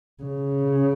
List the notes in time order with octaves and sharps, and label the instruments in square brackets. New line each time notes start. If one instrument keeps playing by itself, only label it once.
[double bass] C#3